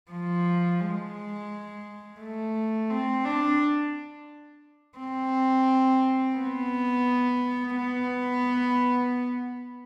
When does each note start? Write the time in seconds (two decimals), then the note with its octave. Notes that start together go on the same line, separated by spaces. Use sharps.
0.12 F3
0.81 G#3
2.20 A3
2.89 C4
3.25 D4
4.98 C4
6.37 B3
7.76 B3